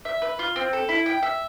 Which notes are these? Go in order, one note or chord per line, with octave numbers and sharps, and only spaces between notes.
E5
B4
F4
C4
A4
E4
G5
E5